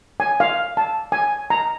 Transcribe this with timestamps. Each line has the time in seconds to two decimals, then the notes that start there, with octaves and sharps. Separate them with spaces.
0.20 G#5
0.40 F5
0.77 A5
1.12 G#5
1.50 A#5